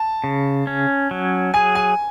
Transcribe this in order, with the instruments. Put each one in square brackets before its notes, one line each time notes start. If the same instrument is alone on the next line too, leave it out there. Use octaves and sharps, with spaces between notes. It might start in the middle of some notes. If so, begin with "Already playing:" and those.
Already playing: [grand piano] A5
[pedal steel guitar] C#3
C#4
F#3
[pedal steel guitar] G#4 [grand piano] G#5
[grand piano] G#5